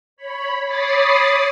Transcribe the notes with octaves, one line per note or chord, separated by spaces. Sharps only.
C#5 B5
C#5 B5 D6 D#6 A6 C7